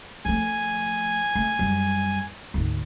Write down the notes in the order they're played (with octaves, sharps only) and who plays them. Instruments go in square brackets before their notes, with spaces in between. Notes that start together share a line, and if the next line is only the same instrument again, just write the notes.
[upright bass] F3 A3 [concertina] G#5
[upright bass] A3
F#2 G3
G#1 D2